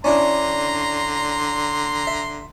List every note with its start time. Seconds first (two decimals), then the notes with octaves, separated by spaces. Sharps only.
0.04 D3 C#4 D4 E4 A#5 C6
2.07 E5